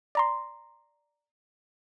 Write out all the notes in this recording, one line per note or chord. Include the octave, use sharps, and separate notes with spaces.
D5 A#5 C6